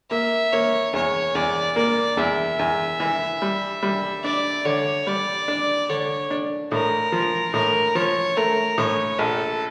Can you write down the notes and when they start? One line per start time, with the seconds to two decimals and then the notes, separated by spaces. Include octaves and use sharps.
0.11 A#3 E5
0.53 A#3 C#5
0.93 E2 C#5
1.35 E2 D5
1.76 A#3 D5
2.17 E2 E5
2.59 E2
3.00 E3
3.42 G3
3.83 G3
4.24 D4 D5
4.65 D3 C#5
5.07 G3 D5
5.48 D4
5.89 D3 C#5
6.31 D4
6.72 A2 A#4
7.12 F3
7.54 A2 A#4
7.95 F3 C#5
8.37 A3 A#4
8.78 A2 C#5
9.19 A#1 A4